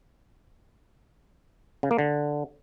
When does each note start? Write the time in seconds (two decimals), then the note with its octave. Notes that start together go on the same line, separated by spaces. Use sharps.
1.83 C#3
1.91 A#3
1.99 D3